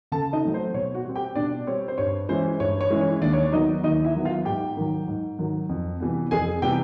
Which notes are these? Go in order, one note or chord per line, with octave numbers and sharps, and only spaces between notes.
C#3 A4 A5
D#4 D#5
F#3 A3 C4
C5
B2 C#5
F#4 F#5
G3 C4
G4 G5
B2 D4 D5
G3 C4 C#5
C5
G2 C#5
E3 G#3 C#4 E4 C5
G2 C#5
C#5
E3 G#3 C#4 E4
C#5
D#2 D4 D5
C#5
D5
D#3 F#3 B3 D#4 D#5
D#2 D#4 D#5
E4 E5
D#3 F#3 B3
F4 F5
G#2 G4 G5
D#3 F#3
G#2
D#3 F#3
F2
C3 E3 G3 B3
F2 G#4 G#5
C3 E3 G3 B3 G4 G5